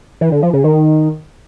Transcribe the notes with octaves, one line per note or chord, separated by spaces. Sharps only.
E3
D3
F3
C#3
D#3